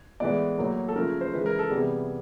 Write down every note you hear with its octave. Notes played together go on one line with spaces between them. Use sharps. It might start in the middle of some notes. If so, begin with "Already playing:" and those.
A2 E3 G#3 B3 D5
A2 F#3 A#3
A4
C#3 F3 A3 A#4
C5
C#3 E3 G#3 B4
A#4
A4
C3 E3 G3 B3 G#4